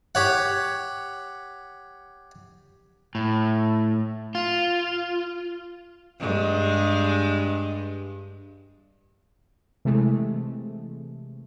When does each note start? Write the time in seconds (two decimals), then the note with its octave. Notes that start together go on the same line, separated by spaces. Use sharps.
0.15 G4 C#5 F#5
3.15 A2
4.35 F4
6.20 G2 G#3
9.85 C3 E3 G#3 A3